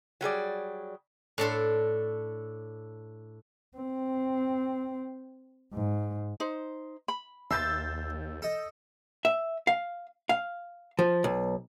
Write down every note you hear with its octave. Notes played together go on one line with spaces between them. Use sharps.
F#3 G3 G#4 D5
A2 D4 A4 C6
C4
G#2
D#4 C5
B5
D#2 E5 C6 E6 G6 A6
A4 D#5
E5
F5
F5
F3
B1